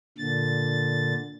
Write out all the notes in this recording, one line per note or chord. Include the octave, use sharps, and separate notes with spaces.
A#2 D3 A6